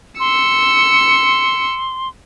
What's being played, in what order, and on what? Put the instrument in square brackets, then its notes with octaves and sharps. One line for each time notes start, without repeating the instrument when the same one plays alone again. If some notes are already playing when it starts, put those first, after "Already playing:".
[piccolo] C6 [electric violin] E6 C#7